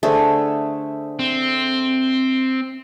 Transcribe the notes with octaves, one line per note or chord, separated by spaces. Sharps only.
D3 A3 G#4 C5 E5
C4